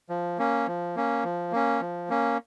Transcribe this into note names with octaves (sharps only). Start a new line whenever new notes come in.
F3
A#3 C#4
F3
A#3 C#4
F3
A#3 C#4
F3
A#3 C#4